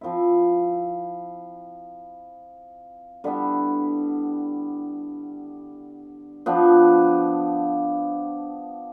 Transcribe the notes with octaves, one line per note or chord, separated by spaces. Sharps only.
F3 C4 E4
D3 G3 B3 E4
F3 B3 D4